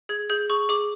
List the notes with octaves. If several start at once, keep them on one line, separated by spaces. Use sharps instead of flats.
G#4 G#6
G#4 G6
G#4 C#6
G#4 D6